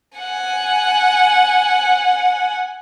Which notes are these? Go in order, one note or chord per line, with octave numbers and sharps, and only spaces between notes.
F#5 G#5